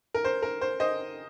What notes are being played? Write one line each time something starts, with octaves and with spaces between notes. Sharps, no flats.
A#4
C5
A#4
C5
C5 D#5